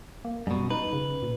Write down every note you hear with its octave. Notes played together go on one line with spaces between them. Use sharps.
A#3
F#2 B2 G3
D#4 B4
C#3
A#2